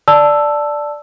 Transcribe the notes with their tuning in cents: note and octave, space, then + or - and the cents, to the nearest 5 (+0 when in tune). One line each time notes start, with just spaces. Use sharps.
D5 +0 A5 +0 E6 +5